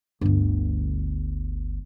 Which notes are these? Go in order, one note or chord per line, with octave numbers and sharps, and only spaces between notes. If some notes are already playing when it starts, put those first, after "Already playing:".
G1 D2